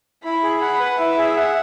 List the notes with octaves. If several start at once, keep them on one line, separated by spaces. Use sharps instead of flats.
E4 B5
G#4
F#5 B5
B4
E4 E5
G#4
F#5